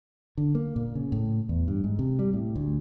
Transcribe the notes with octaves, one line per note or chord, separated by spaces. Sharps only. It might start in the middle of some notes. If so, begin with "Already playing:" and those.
D3
A#3
A#2
C#3
A2
E2
G2
G#2
C3
G3
A2
D2